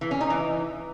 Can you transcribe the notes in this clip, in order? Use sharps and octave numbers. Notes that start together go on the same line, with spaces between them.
E3
C#4
D#4
E3